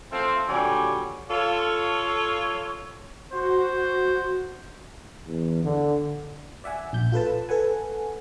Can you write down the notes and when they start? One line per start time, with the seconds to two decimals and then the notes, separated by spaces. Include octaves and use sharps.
0.11 F3 A3 C4
0.47 A#2 D3 F#3 G3 C#5 G#5
1.30 F4 A4 C#5
3.33 F#4 C5
5.26 E2
5.64 D3
6.64 D5 E5 F#5 G#5
6.93 A#1 G6
7.12 F4 A4 B4 A5
7.49 A4 B4 F#5 G#5